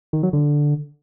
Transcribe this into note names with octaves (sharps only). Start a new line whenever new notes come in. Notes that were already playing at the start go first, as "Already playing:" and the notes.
D#3
F#3
D3